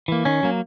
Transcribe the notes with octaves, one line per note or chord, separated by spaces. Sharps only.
E3 A#3
D#3 C#4
F#3 A#3